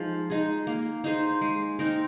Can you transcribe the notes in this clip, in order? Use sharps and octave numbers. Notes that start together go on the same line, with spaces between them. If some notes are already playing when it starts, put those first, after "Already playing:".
Already playing: F3 G#3 D#4 G#4
G#3 D#4 G#4
A#3
D#4 G#4 C5
G#3
C4 D#4 A#4